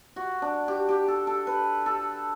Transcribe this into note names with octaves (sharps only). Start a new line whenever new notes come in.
F#4
D4
G4
G4
A4
A4
B4
A4